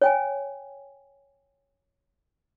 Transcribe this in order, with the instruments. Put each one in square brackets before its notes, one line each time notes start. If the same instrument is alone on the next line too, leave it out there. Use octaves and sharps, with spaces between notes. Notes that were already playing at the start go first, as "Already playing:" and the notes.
[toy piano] C#5 G5 G#5